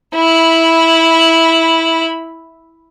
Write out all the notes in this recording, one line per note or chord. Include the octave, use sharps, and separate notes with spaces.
E4 B5